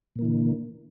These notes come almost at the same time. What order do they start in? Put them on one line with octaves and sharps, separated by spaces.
A#2 A#3 E3 D3